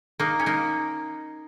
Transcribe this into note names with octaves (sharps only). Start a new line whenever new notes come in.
A#3 D#4
C#4
A#3 D#4